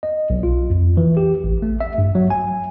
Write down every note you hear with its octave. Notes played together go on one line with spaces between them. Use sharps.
D#5
B1
F4
F2
E3
G4
A1
A3
E5
G2
F#3
G#5